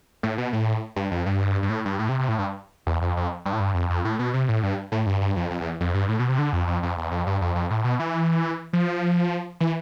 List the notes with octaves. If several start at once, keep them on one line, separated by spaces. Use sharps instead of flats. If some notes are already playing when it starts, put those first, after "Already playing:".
A2
B2
A2
G2
F2
G2
G2
A2
G2
A2
C3
C3
A2
G2
E2
F2
F2
G2
A2
G2
F2
F2
A2
B2
C3
A2
G2
A2
G2
G2
F2
F2
E2
F2
G2
A2
B2
C3
D3
F2
F2
F2
E2
F2
G2
F2
F2
A2
B2
E3
F3
E3